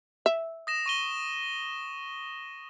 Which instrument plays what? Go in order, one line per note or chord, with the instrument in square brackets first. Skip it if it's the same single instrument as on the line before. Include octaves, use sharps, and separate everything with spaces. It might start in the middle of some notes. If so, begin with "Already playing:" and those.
[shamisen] E5
[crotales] D#6 A#6 E7
C#6 D#7 G7